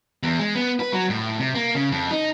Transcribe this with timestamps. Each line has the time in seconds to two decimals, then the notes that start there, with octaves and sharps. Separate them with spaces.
0.23 E2
0.39 G#3
0.55 B3
0.80 B4
0.93 F#3
1.10 A2
1.39 C3
1.55 A#3
1.74 C#3
1.92 F2
2.11 D#4